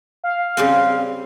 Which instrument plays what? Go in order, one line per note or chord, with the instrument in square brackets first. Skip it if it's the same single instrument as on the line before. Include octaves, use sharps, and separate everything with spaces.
[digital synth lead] F5
[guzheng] C#3 G3 C4